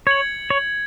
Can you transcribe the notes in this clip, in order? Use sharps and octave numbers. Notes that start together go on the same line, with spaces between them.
C#5 G#6 C#7 F#7
C#5